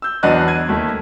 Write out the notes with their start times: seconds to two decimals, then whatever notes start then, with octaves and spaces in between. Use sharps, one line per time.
0.02 E6 G6
0.23 E2 F#3 D4 B4 D#5 F#6
0.48 G#6 D#7
0.69 D#2 A3